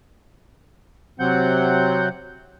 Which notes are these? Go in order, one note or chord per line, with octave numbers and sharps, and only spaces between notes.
C3 F#3 C4 F#5 G6